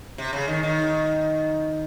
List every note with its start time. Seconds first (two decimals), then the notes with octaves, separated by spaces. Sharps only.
0.18 C3
0.33 C#3
0.48 D#3
0.63 D#3